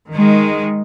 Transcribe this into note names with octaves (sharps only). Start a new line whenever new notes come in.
D#3 G#3